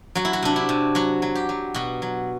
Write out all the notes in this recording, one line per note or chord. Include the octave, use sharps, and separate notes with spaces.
F#3 F#4
E4
F#4
C3 D4
E4
C3
F#3 F#4
F#3
G4
F#3
B2 F#4
F#3